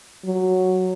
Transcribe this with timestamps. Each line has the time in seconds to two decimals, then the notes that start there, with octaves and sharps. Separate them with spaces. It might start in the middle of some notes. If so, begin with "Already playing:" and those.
0.25 F#3